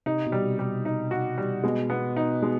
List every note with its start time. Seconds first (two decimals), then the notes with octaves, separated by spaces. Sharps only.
0.06 C3 D#4
0.27 B2
0.32 G3
0.46 C3
0.59 G3
0.85 D#4
1.11 F#4
1.38 G3
1.64 B2 G#3
1.90 B3
2.17 D#4
2.42 B2 G#3